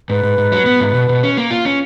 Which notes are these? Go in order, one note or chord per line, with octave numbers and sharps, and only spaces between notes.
G#2 B4
G#2
G#2
F#3
B3
G#2
B2
B2
C#4
A#3
F4
C#4